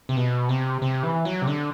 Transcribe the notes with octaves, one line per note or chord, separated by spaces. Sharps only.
C3
B2
C3
C3
E3
F#3
C3
D3